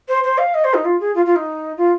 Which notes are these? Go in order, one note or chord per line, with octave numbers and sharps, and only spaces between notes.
C5
C5
F5
D#5
C5
D#4
F4
G#4
F4
F4
D#4
F4